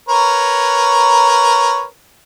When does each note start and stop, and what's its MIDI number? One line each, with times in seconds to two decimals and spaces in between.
0.09 1.84 70
0.09 1.84 71
0.09 1.84 73